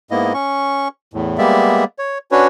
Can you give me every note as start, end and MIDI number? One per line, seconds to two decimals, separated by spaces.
0.11 0.33 44
0.11 0.33 58
0.11 0.33 59
0.11 0.33 64
0.11 0.33 75
0.34 0.88 61
0.34 0.88 85
1.14 1.38 40
1.14 1.38 45
1.38 1.84 55
1.38 1.84 56
1.38 1.84 58
1.38 1.84 59
1.38 1.84 74
1.38 1.84 76
1.98 2.18 73
2.31 2.47 61
2.31 2.47 62
2.31 2.47 66
2.31 2.47 71
2.31 2.47 73